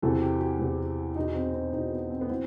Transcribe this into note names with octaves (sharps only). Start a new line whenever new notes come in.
E2 C3 E3 A4
G4
G4
E2 C3 E3
E2 B2 D#4
C4
C4
E2 B2 D#4
B3
C4
B3
E3 C4